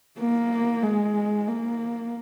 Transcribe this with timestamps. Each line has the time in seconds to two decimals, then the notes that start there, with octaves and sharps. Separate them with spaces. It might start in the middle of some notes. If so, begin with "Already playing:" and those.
0.19 A#3
0.83 G#3
1.47 A#3